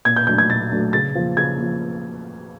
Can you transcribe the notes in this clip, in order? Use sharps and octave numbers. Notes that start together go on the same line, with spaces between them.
A#2 G#6
G6
F#3 A3 D4 G6
G#6
A#2 A6
F#3 A3 D4
C#3 A6
F3 A#3
C#3 G#6
F3 A#3